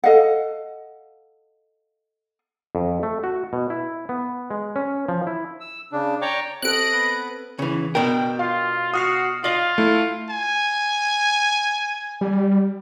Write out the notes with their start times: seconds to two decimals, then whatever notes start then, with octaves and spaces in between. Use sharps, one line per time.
0.04 A4 D#5 F5 F#5
2.75 F2
3.03 A3
3.24 F#4
3.53 B2
3.70 E4
4.09 B3
4.51 G#3
4.76 C#4
5.09 F3
5.27 E4
5.60 E6
5.92 C#3 D4
6.22 C#5 D5 G5 A#5 C#6 D6
6.62 C4 A4 D#5 F#6 D7
6.93 B3 B4
7.59 C#3 E3
7.95 B2 D4 A#4 G5
8.39 F4 F5
8.94 F#4 D#6 F6 C7
9.44 F4 D5 D#5 F5
9.78 A3 E4
10.29 G#5
12.21 G3